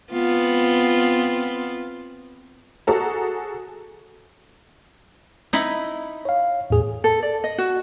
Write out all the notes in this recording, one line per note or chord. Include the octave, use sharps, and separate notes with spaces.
B3 C4 F4
F#4 G#4 A4 A#5
D#4 E4 B5
C#5 F5
E2 A2 G#4
A4
D5
D#5
F#4